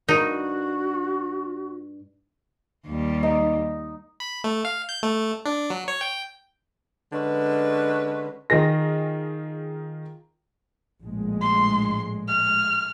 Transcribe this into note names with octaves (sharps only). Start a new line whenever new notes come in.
G2 D#4 F#4 A#4
D#2 G3
D#4
B5
A3
F5
G6
A3
D4
F#3
C#5
G5
D3 G#3 C#4 B4
D#3 F4 G#4 A#6
A#1 A2 G#3
C6
F6